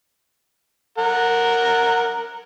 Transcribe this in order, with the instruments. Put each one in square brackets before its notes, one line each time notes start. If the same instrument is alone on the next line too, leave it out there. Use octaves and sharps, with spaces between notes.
[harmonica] A#4 F#5